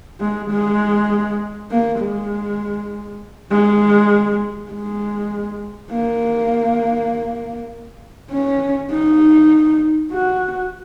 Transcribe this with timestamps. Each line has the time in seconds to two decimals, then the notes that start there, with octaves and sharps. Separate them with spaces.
0.20 G#3
0.50 G#3
1.70 A#3
2.00 G#3
3.51 G#3
4.71 G#3
5.91 A#3
8.31 C#4
8.91 D#4
10.11 F#4